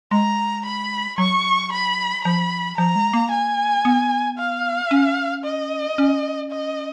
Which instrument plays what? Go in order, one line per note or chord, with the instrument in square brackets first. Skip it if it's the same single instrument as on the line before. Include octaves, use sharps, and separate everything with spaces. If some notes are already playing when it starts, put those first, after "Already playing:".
[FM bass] G#3 [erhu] A#5
[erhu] B5
[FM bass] F#3 [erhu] C#6
[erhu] B5
[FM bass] F3 [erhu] B5
[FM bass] F3 [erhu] A#5
[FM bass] G#3
A#3
[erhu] G#5
[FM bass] B3
[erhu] F5
[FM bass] C#4
[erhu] D#5
[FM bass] C#4
[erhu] D#5